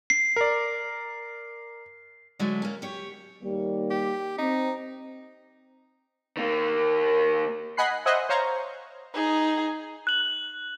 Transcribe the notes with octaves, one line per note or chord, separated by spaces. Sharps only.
C7
A#4 D5
D3 F#3 G#3 A3
A#3 C#4
G4 C#5
D#2 G3 A#3
G4
C4 D#4
D#3 A#3
D#5 F#5 G#5 B5 F#6 C7
C5 D#5 E5 F#5 G#5
C5 C#5 F5 A#5 C#6
D#4 G#4
F#6 F#7